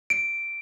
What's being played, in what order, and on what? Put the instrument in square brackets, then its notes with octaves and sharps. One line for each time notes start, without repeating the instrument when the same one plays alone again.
[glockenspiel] D7